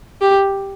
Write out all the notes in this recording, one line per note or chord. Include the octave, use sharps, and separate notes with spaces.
G4